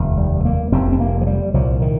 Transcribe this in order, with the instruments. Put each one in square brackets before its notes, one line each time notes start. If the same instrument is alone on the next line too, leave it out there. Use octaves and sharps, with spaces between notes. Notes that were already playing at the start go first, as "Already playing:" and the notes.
Already playing: [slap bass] F1 D#2
G3
A#3
F1 F2 C3 C4
C4
A#3
F3
G3
C2 A#2 F3
D#3